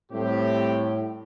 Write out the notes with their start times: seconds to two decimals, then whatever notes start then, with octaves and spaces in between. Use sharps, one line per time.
0.12 A2 G3 C4 G4